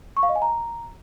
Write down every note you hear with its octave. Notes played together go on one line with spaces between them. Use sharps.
C#6
F5
D#5
G#5
A#5